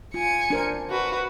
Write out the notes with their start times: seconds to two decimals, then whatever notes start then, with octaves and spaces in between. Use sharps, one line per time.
0.14 F4 G#5 C#7
0.50 D4 A#4 C5
0.90 F#4 B4